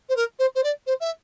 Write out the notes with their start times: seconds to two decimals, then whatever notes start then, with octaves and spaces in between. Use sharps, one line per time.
0.09 C5
0.16 A#4
0.39 C5
0.55 C5
0.63 D5
0.87 C5
1.00 E5